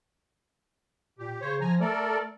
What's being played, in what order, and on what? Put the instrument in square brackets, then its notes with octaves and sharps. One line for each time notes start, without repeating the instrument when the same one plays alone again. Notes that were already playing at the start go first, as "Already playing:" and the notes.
[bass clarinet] A#2 [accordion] G4
[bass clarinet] C#3 [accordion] C5 C#5
[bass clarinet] F3 [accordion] G#5 A#5
[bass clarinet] A3 [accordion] A4 A#4 D5